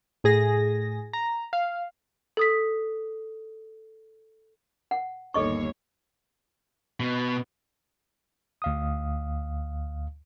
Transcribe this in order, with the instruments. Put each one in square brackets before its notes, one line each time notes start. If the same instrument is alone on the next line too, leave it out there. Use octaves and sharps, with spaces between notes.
[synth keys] A2 G#4 A#6
A#5
F5
[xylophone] A4 D#6 B6
[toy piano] F#5
[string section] G1 D#2 C#5 [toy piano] A4 D#5 C#6
[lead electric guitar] B2
[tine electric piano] D2 F5 D#6